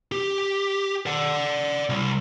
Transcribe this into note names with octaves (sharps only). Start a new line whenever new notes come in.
G4
D5 F#5
C2